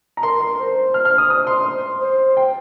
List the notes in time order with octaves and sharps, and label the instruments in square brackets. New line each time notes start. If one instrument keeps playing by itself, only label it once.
[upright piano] A#5
[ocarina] A#4 [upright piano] C6
[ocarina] A#4
[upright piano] C6
[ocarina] A#4
C5
[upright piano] F6
F6
D#6
[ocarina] C5 [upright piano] D#6
[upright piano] C6
[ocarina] C5
[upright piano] G5